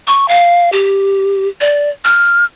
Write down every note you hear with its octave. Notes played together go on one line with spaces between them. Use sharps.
C#6
F5
G4
D5
F6